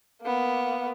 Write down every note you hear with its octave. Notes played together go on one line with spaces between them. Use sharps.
A#3 B3